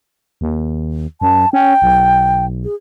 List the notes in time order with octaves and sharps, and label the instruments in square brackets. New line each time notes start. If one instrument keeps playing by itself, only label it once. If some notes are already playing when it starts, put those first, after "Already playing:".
[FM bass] D#2
[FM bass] F#2 [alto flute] A5
[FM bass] C#4 [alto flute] G5
[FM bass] B1
[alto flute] G#4